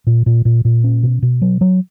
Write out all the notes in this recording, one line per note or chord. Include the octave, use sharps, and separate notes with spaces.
A#2
A#2
A#2
A#2
C#4
B2
B2
F#3
F#3